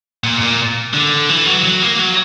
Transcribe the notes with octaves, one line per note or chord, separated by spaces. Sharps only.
A#2
A#2
D3
E3
F#3
F#3
A#3
F#3